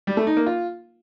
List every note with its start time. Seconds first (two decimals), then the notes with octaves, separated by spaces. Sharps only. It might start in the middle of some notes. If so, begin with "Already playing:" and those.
0.07 G3
0.17 A3
0.27 D#4
0.37 A#3
0.46 F4